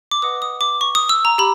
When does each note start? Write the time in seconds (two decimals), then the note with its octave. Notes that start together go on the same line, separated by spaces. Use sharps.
0.11 D6
0.22 B4 D#5 F#5 D#6
0.42 D#6
0.61 D6
0.81 C#6
0.95 D#6
1.09 E6
1.25 A#5
1.38 G4 B5